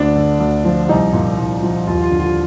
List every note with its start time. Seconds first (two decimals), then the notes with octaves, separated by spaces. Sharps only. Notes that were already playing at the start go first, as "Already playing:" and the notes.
Already playing: D2 D4
0.16 D3
0.40 D2
0.65 F3
0.88 C2 D#4
1.13 A#2
1.38 C2
1.63 F3
1.87 D#2 F4
2.02 F4
2.11 D3
2.19 F4